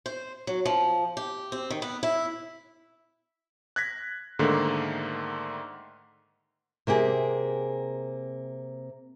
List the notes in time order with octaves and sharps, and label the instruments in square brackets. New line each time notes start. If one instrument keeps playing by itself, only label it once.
[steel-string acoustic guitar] C5
F#3
F3
G4
C4
D#3
B3
E4
[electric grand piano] F#6 G#6 A#6 B6
G#2 D3 D#3 A3 A#3
[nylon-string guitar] C3 A#3 G4 G#4